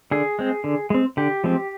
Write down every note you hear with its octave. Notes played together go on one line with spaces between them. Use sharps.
D3 G#4
G#3 C4
D3
G#3 C4
D3 G4
F3 G#3 C4